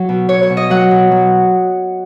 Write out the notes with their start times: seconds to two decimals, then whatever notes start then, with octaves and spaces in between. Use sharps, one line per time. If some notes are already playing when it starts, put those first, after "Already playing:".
Already playing: F#3
0.09 B2
0.29 B2 C#5
0.43 C#5
0.50 B2
0.57 D#5
0.70 F#3 F#5
0.91 B2
1.11 F#3